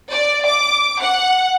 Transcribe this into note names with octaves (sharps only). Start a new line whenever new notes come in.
D5
D6
F#5